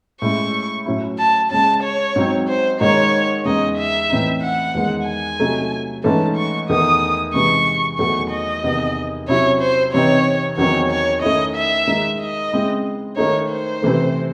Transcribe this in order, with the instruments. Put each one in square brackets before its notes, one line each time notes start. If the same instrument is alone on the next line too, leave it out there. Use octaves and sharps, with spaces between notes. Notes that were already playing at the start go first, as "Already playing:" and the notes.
[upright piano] A2 G#3 C#4 E4 [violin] C#6
[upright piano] A2 F#3 C#4 E4
[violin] A5
[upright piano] C#3 G#3 C#4 [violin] A5
[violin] C#5
[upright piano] G#2 F#3 C4
[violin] C5
[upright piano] G#2 D#3 G#3 D#4 [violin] C#5
[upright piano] E2 C#3 G#3 D#4 [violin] D#5
[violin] E5
[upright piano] A2 E3 C4 D#4
[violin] F#5
[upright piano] E2 D#3 G#3
[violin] G#5
[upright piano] C3 F#3 A3 D#4
[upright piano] G#2 E3 A3 C#4 [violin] A5
[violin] C#6
[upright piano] E2 D#3 A3 [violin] D#6
[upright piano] C3 E3 G#3 D#4 [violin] C#6
[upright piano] E2 D#3 F#3 A3 [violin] C#6
[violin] D#5
[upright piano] E2 C3 D#3
[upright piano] C3 F#3 C#4 E4 [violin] C#5
[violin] C5
[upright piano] C3 E3 C4 D#4 [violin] C#5
[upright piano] E2 D#3 F#3 C4 D#4 [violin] C#5
[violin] C#5
[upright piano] D#3 A3 C#4 E4 [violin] D#5
[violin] E5
[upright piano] D#3 G#3 D#4
[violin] D#5
[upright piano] C#3 G#3 C4 E4
[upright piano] D#3 A3 D#4 [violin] C#5
[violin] C5
[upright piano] C3 E3 A3